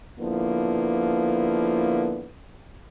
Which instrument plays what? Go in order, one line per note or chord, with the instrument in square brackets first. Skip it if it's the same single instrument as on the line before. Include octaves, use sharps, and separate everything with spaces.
[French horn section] D3 F3 A#3 B3 E4